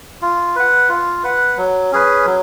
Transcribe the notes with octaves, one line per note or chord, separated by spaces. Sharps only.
F4
B4 F#5
F4
B4 F#5
F#3
C#4 G#4 B4
F#3